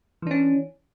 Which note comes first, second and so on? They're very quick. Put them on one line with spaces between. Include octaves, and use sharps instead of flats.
E3 D4 C#4